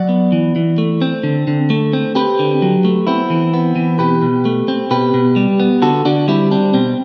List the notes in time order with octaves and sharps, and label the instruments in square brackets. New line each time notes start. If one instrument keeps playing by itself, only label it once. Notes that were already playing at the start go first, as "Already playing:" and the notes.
Already playing: [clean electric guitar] F#3 D5 F#5
B3
E3
E3
A3
C4
D3
D3
A3
C4
C4 G4 B4
D3
F#3
A3
B3 C4 E4
E3
B3
E3
B2 G4 B4
B2
A3
C4
B2 G4 B4
B2
G3
B3
D3 F#4 A4
D3 D4 F#4
G3 C4 E4
C4 D4
B2 C4